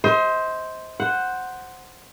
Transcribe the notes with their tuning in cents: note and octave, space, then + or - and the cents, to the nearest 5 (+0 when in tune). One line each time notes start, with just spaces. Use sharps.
C5 +0 D#5 +40
C5 +0 F#5 +0